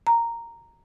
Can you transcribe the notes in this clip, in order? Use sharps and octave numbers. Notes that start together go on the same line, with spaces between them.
A#5